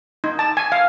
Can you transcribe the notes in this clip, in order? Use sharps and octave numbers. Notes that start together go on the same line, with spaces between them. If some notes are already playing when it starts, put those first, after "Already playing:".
D#4
A5
G#5
F5